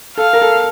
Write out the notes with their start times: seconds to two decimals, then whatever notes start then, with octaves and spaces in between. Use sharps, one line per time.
0.18 A4 F5
0.33 A#4
0.42 A4